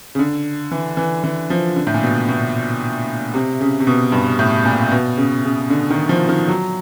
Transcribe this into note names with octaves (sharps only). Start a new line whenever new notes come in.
C#3
D3
E3
E3
E3
F3
D3
A2
A#2
B2
B2
C3
C#3
C3
B2
G2
A2
A#2
B2
C#3
C#3
D3
D#3
F3
D#3
F#3